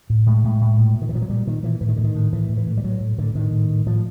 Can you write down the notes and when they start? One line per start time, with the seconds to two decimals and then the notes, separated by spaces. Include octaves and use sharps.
0.10 A2
0.26 A2 G#3
0.44 A2
0.61 A2
0.78 A#2
0.95 A#2
1.02 D#3
1.09 E3
1.13 A#2 F3
1.22 F#3
1.29 A#2 G3
1.47 A#2 D#3
1.63 A#2 E3
1.81 A2 E3
1.89 D#3
1.96 A2 D3
2.04 D#3
2.15 A2
2.33 A2 E3
2.49 A2
2.57 E3
2.67 A2
2.77 G3
2.84 A2 F#3
3.00 A2
3.18 A2 D3
3.35 A2 D#3
3.52 A2
3.70 A2
3.86 A2 F3